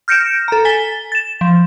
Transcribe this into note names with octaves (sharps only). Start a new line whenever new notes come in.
F6 G6 A#6 C#7 D7 E7
A4 A#5
G#5 A6 B6 G7
A6 E7
F3